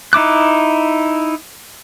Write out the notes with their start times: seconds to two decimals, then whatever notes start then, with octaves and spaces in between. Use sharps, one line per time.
0.13 D#4 E4 D6 F#6